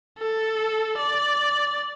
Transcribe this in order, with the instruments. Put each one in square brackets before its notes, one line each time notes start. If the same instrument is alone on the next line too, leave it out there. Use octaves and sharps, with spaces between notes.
[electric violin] A4
D5